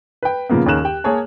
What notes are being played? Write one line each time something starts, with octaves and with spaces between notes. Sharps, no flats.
B4 G5
A#2 C#3 F3 A#3 B3
D#2 C#4 G#4 A#4 F#6 E7
G4 G5
A#3 G#4 C#5 A5